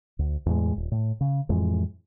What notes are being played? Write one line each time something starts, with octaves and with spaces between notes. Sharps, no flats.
D2
E2 A2 G#3
D#1
A2
C#3
F2 A2 E3 G#3